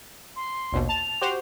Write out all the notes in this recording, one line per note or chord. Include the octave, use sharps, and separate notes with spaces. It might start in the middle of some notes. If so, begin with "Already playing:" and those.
C6
A#1 D#2 B2
A5 F7
F#4 G4 C5